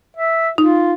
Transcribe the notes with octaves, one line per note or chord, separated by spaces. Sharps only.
E5
D#4 F4